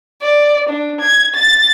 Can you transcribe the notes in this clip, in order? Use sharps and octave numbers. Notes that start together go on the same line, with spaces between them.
D5
D4
G#6
A6